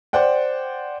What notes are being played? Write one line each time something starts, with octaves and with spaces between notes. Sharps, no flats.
C5 D5 F#5 G5